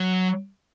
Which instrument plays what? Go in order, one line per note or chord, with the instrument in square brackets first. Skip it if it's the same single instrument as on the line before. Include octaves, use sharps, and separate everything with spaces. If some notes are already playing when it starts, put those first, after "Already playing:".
Already playing: [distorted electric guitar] F#3